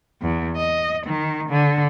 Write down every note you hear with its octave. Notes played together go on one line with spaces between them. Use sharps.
E2
D#5
D#3
D3